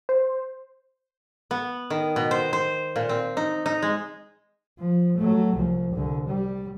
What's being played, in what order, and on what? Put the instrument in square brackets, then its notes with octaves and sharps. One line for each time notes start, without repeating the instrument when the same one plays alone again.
[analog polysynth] C5
[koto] B3
D#3
B2
C5
C5
A#2
C4
D#4
D#4
G#3
[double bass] F3
F#3 A3
C2 F3
C2 D3
G3